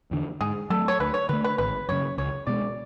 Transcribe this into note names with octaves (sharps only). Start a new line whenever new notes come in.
E2 D3
G#2 G#4
F#3 A3 A4
C#5
D2 B4
C#5
D3 A3 B4
B4
G#1 B4
F#2 C#3 C#5
C#2 C#5
B2 G#3 D5